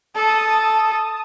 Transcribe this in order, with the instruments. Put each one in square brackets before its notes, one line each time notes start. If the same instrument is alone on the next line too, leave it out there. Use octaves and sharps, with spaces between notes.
[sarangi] A4 [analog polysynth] A5 D#6